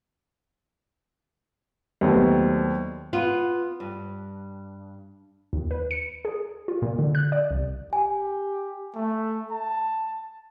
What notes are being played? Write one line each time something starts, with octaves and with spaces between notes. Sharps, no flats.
D#2 A#2 F#3 A3 B3 C4
B3 F4
G2
D#2
B4
C#7
G#4
F4
A#2
D3
F#6
D5
C2
G4 G#5
A3
A5